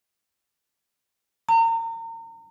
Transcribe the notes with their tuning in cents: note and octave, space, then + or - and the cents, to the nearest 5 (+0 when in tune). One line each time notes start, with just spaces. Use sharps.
A#5 -35